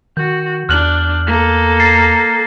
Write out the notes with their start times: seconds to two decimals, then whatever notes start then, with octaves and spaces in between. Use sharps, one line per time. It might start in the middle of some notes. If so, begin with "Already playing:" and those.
0.17 D#3 F#4 G6
0.69 E2 D4 F6 F#6 F#7
1.27 A#3 A4
1.80 A6 C7